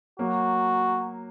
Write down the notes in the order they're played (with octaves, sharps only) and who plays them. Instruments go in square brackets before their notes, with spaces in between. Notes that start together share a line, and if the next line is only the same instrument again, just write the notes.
[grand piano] F#3 A#3 [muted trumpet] F#4